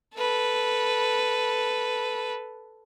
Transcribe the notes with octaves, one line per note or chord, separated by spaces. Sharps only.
A4 B4